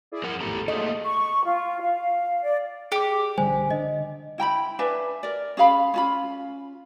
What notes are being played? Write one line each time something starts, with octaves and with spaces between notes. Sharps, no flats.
E4 G#4 D5
F2 A#4 F#5 D#6
G#1 E2 A2 G4 A4 A#5
F#3 A3 A#3 F4 G#4 A4 D#5
C#6
F4
F5
D5
G4 G#4 D6
B1 D3 G3 C5 G#5
D3 D4 D#5
E4 G5 A#5 B5
D4 B4 E5 G#5
A#4 D5
C#4 G#4 F5 B5
C#4 F4 B5